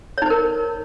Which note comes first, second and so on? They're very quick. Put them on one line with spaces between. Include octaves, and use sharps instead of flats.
C#5 D#4 C5 A#4